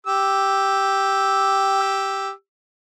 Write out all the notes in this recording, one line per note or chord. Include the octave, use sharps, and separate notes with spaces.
G4 E6